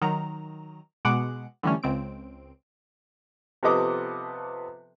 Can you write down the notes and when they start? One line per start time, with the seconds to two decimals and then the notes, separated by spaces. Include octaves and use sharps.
0.02 D#3 F#3 A#5
1.05 B2 G#3 F#5 D6
1.63 D3 E3 G3 A3 C#4
1.83 C#2 C4 D7
3.63 C3 F3 B3 A4 D#5 D6